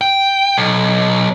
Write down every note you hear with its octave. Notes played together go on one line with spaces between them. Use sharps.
G5
B1